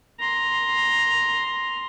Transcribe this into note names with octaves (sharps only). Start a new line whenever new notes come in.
A#5 C6